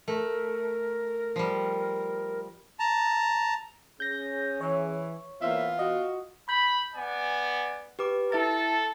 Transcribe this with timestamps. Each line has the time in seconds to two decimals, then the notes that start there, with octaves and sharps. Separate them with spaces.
0.08 A3 A#4
1.36 F3 G3
2.80 A5 A#5
4.00 C#4 G#4 G6 A#6
4.61 E3 C#5
5.41 E3 A#3 B3 F4 C5 E5
5.79 F#4 D#5
6.49 B5 G6
6.94 B3 D5 G#5
7.99 G4 B4 D6
8.32 E4 A4 E5 A6